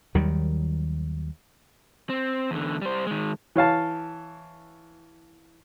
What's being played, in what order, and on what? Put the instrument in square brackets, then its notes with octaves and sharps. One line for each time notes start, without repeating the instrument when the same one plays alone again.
[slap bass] D#2 D#3 F#3 G3
[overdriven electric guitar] C4
E2 D3
G3 C5
D#3 G#3
[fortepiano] E3 C#5 F5 A5